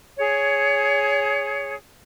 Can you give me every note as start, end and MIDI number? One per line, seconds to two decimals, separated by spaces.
0.17 1.75 68
0.17 1.75 73